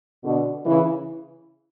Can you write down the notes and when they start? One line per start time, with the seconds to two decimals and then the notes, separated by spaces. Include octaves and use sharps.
0.25 B2 D3
0.66 C#3 E3